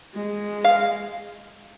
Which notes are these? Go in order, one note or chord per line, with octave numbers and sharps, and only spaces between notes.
G#3
F5